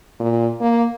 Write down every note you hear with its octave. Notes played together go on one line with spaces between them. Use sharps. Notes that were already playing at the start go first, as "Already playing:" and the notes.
A#2
A#3